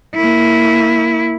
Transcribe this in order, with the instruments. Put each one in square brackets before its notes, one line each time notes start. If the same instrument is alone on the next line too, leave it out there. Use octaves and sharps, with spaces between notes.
[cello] A#3 E4